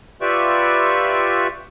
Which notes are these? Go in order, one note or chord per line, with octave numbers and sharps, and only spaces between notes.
F4 G4 B4 D5 E5 C#6